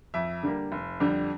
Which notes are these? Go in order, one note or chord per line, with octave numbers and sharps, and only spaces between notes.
F2 E5
D3 G3 A#3
F1
F2 D3 G3